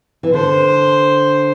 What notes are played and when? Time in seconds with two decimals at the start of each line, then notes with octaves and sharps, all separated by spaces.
0.23 E3
0.33 D3 C5